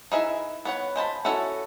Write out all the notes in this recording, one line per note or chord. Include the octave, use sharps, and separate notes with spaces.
D#4 E4 G#4 B4 E5
B3 C#5 F#5
G#3 C5 A5 B5
C#4 E4 F#4 A4